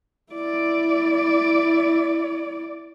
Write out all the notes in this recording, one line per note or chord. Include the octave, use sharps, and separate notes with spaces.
E4 D5